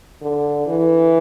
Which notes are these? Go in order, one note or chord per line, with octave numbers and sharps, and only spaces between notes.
D3
E3